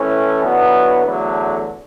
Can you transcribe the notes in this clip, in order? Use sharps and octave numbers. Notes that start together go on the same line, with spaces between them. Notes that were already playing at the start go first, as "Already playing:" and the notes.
Already playing: A2 E3 A3 C#4
D3 F#3 B3 E4
E2 D3 F#3 A3